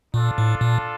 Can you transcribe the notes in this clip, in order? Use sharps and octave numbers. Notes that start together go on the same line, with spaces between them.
A#2 D4 F4 A4
A2
A#2